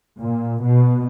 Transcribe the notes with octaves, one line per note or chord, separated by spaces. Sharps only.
A#2
B2